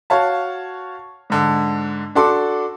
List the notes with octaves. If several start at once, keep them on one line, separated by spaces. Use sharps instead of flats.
F#4 C#5 F5 A5
G#2 D3
D4 F#4 A4 C6 D6